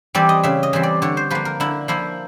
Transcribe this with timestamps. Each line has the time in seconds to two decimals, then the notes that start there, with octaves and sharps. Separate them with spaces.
0.15 E3 G3 C4 D5
0.29 D#5
0.43 C#3 E5
0.63 D#5
0.73 E3 G3 C4
0.83 D5
1.02 D3 C#5
1.17 C5
1.30 F3 A#3 B4
1.45 A#4
1.60 D3 E4
1.88 F3 A#3 E4